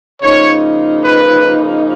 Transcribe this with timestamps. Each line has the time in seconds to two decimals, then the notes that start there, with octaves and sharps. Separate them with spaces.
0.22 C#3 F3 A#3 D#4 C#5
1.05 B4